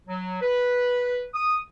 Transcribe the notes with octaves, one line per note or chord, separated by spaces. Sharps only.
F#3
B4
D#6